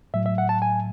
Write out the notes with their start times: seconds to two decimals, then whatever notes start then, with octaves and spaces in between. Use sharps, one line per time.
0.14 A2 F#3 E5
0.26 E5
0.38 F#5
0.49 A5
0.62 G#5